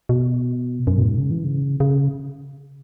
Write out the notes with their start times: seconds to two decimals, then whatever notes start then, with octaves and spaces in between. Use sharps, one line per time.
0.09 B2
0.87 F#2
0.98 B2
1.03 G#2
1.18 C#3
1.31 E3
1.44 C#3
1.80 C#3